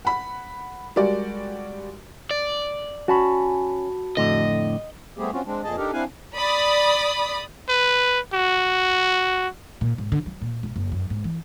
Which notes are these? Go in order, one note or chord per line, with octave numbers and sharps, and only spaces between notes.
F#5 B5
G3 G#3 F#4 A#4 D5
D5
C#4 F#4 A5 B5
F2 A2 D3 D#5
G3 A3 B3 C4 G4 G#4
C4 C#4 F4 F#4
G#3 C4 D4
F2 A#2 G#4 D#5 A5
D4 D#4 G4 A4 A#4
C4 D4 E4 F5 F#5 G#5
D5 B5 D#6
B4
F#4
A#2
G#2
D3
F#3
A#2
E1
F#1
F#2
G#2
E3